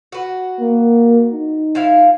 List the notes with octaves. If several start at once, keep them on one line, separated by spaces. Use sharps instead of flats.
F#4 B4
A#3
D#4
F3 E4 F5